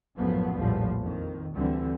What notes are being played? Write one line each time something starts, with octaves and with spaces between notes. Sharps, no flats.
A#1 F#2 A2 F3 F#3 B3
A#1 E2 A2 F3 G3
F2 D#3
D2 D3 E3 G3 C4